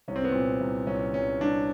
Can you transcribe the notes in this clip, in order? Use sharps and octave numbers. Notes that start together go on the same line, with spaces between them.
C2 C#4
C4
B3
A#2 C4
C2
C2 C#4
C2 C#4
C2 D4